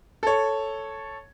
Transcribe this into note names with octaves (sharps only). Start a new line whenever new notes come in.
A4 C#5